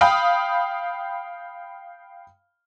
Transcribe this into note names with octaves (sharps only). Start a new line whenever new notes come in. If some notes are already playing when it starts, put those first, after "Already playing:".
F5 G5 B5 D#6